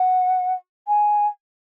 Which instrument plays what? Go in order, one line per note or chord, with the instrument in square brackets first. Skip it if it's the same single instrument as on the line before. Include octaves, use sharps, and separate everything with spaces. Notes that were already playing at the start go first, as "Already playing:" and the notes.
Already playing: [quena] F#5
G#5